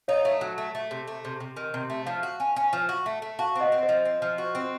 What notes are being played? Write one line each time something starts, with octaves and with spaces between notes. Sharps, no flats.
D#4 C#5 F5
A3
F#3
A3
A3
C3
A3
C3
C3
D#3
C3
A3
F3 F5 A5
F#4
C#4
C#4
F3
F#4
A3
A3
F#4 F5 A5
C4
D#5 F#5
C4
C5 D#5
F3
C4
F3
F#4
C4